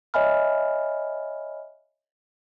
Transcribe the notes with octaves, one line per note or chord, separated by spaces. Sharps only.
C#5 D#5 E5 G#5 B5 F6